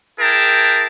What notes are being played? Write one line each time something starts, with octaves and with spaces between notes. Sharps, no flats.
E4 G#4 A#4 G5 A5